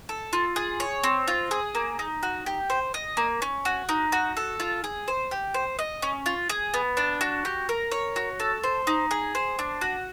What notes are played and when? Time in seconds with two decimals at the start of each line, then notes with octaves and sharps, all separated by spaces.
0.09 A4
0.33 F4
0.56 G#4
0.80 C#5
1.03 C4
1.28 F4
1.51 G#4
1.75 A#3
1.99 D#4
2.23 F#4
2.46 G4
2.70 C5
2.94 D#5
3.17 A#3
3.42 C#4
3.65 F#4
3.89 D#4
4.12 F#4
4.37 A4
4.60 F4
4.84 G#4
5.08 C5
5.31 G4
5.54 C5
5.79 D#5
6.02 C#4
6.26 F4
6.49 G#4
6.74 B3
6.97 D4
7.21 F#4
7.45 G4
7.69 A#4
7.92 C#5
8.16 F#4
8.40 A4
8.63 C5
8.87 D#4
9.11 G#4
9.35 C5
9.59 D4
9.81 F#4